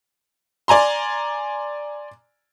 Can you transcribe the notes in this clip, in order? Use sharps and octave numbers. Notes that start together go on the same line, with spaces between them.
D5 G#5 A#5 C6